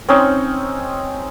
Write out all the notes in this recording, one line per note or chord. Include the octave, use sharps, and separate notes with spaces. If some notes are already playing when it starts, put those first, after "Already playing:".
C4 C#4 D#4